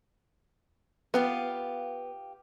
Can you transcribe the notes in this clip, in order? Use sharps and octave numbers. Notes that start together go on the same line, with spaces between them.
B3 F4 G4 F5